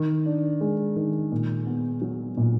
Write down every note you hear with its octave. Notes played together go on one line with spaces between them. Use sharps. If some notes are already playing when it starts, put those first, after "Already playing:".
Already playing: D#3
D4
G#3
D#3
A#2
B3
F#3
A#2